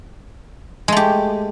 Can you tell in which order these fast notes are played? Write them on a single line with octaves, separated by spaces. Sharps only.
G#3 A3 G4